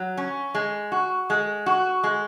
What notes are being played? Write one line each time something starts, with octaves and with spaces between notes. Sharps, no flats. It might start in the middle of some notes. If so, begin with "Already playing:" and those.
Already playing: F#3
C#4
G#3
F#4
G#3
F#4
G#3